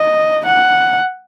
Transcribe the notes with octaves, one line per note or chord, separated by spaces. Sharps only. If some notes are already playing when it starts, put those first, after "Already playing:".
Already playing: D#5
F#5